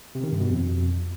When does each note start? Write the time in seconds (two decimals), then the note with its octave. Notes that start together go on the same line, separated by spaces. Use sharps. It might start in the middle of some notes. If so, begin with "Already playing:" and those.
0.15 C3
0.23 D#3
0.32 G2
0.40 B2
0.49 F2